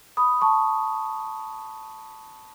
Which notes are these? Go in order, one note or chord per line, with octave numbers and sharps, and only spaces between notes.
B5 D#6
A5 C#6